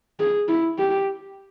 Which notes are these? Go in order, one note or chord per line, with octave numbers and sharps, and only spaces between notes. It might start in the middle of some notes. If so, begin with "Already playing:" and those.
G#4
E4
G4